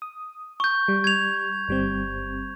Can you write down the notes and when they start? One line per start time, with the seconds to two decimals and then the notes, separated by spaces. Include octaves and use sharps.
0.02 D#6
0.60 C#6 G6
0.88 G3
1.04 G#6 F7
1.68 G1 G3 C4